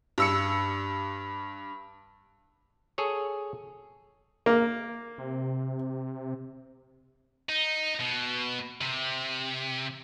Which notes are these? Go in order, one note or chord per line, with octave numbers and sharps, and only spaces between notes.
G2 E6 C#7
G#4 A4 C#5
A#3
C3
D#4
B2
C3